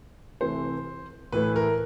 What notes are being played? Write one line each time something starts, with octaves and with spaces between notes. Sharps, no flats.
C3 E3 A3 C5
A2 E3 A3 B4
A#4